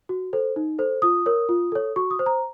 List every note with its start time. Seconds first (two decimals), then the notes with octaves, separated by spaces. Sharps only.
0.09 F#4
0.33 A4 C5
0.56 D#4
0.79 A4 C5
1.02 F4 D#6
1.26 A#4 C#5
1.49 F4
1.72 A4 C#5
1.96 F#4 C#6
2.11 D#6
2.19 C5
2.26 A#5